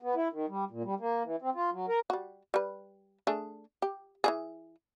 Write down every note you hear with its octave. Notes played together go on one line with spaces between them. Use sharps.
B3
E4
D#3
G3
A#2
G3
A#3
E3
C4
F4
F#3
A#4
G3 F#4
G3 B4
A3 D4 G#4
G4
E3 G3 G#4